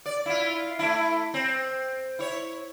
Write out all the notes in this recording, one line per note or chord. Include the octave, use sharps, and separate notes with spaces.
D5
E4 F4
A3 E4
C4
E4 C#5